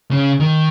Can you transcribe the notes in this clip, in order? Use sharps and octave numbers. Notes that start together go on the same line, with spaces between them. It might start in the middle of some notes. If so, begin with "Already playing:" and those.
C#3
D#3